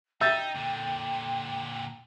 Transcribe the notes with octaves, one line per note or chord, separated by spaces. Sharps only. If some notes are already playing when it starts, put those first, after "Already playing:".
D#4 E5 G5 G6 A6
A#2 D3